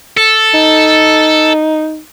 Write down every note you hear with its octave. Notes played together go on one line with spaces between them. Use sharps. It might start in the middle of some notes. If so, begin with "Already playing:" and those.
A4
D#4